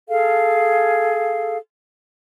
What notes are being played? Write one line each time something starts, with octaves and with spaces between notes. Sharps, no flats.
G#4 A4 F5